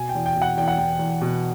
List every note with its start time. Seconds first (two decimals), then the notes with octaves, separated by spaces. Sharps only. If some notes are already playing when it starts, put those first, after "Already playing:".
Already playing: B2 G#5
0.09 G5
0.15 E2
0.26 G5
0.36 B2
0.42 F#5
0.57 E2 G5
0.68 F#5
0.78 E2 G5
0.99 E2
1.21 B2